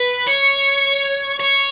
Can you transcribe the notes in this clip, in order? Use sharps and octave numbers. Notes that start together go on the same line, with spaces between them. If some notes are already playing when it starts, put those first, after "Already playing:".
Already playing: B4
C#5
C#5